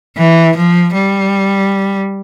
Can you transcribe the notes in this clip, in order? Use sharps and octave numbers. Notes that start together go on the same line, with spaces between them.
E3
F3
G3